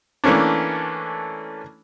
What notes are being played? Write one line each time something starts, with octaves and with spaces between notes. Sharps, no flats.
E3 A3 A#3 C#4 D4